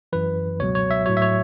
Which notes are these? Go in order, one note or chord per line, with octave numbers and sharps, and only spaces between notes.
F#2 E3 B4
C#2 B2 F#3 C#5
C#5
E5
A2 F#3 C#5
E5
C#5